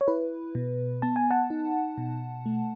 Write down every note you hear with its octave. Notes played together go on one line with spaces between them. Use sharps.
C#5
E4 B4
B2
B3 A5
G#5
F#5 A5
D#4
B2
A3